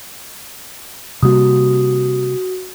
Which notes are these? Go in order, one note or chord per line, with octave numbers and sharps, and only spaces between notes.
C3 G3 A#3 F#4 D#6